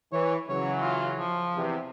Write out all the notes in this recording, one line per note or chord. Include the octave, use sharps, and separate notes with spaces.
E3 C#5
C#3 E3 F#3 C#5
F4
F3
E2 C3